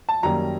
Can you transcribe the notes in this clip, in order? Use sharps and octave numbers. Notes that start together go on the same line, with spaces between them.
A5
F#2 D#3 G3 A#3 A#5